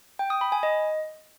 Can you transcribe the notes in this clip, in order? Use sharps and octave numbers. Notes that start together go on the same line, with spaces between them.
G5
D#6
B5
G#5
D#5